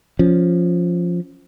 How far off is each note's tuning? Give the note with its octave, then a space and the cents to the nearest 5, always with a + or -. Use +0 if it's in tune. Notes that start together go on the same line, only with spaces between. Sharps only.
F3 +0 C#4 +0